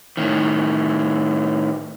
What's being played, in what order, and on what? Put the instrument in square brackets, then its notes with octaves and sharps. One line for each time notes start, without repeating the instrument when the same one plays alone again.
[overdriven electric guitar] A2 D#3